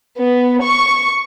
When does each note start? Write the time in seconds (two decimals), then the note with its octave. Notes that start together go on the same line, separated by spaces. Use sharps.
0.19 B3
0.65 C#6